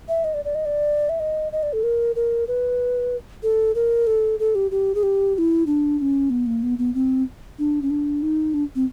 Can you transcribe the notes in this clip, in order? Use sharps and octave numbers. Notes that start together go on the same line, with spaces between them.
E5
D#5
D5
D5
D#5
D5
E5
D#5
D#5
D5
A4
A#4
A#4
B4
A4
A#4
A4
A4
G4
G4
G#4
G4
G4
E4
D4
D4
C#4
B3
A#3
B3
B3
C4
D4
C#4
D4
D#4
D4
C4